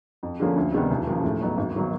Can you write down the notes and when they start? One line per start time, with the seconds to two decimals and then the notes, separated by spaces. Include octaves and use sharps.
0.23 F2
0.40 D3 F3 A#3 C#4
0.56 D2
0.73 C3 D#3 G3 B3
0.90 E1
1.07 D#2 C#3 F3
1.23 A2
1.41 F#3 B3 D#4
1.57 G#1
1.76 D#3 F#3 B3